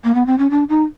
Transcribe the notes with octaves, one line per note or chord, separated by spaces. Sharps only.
A#3
B3
C4
C#4
D4
D#4